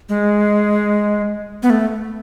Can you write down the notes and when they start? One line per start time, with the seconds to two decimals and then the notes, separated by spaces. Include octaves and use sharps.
0.09 G#3
1.63 B3
1.70 A3